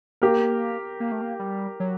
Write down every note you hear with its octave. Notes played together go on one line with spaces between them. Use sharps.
A#3 G4 A#4
A#3
A3
A#3
G3
F#3